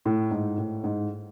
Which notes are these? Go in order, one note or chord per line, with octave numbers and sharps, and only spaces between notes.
A2
G#2
A2
G#2